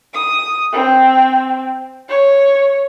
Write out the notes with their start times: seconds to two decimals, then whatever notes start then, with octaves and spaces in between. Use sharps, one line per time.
0.14 D#6
0.73 C4
2.09 C#5